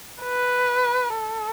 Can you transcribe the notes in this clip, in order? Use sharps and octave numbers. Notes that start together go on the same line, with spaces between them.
B4
A4